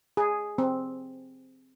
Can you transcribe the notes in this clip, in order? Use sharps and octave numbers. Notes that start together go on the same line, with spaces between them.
G#4
C4